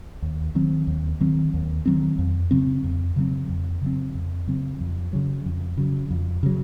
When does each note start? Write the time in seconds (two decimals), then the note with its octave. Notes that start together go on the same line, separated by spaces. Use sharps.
0.22 D#2
0.55 D#3 F#3 C4
0.87 D#2
1.20 D#3 F#3 C4
1.54 D#2
1.86 D#3 F#3 C4
2.19 F2
2.51 C#3 F#3 C4
2.84 F2
3.16 C#3 F#3 C4
3.49 F2
3.81 C#3 F#3 C4
4.15 F2
4.47 C#3 F#3 C4
4.81 F2
5.13 C#3 F#3
5.45 F2
5.77 C#3 F#3
6.11 F2
6.43 C#3 F#3